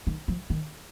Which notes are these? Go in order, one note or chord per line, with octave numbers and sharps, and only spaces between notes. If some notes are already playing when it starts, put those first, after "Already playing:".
D#3
F3
D#3